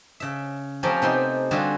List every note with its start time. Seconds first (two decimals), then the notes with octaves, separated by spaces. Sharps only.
0.20 C#3 E5
0.83 F3 A3 C4 C#4 G4 A#4
1.02 C3 B3 C4 D#4 G5 C6
1.51 D3 G3 C4 F4 F#4 G#4